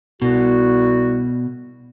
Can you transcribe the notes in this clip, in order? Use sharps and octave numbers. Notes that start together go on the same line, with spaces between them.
C2 B2 G3 F#4